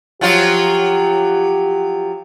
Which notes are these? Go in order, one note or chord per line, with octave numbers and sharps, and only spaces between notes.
F3 F#3 F4 G4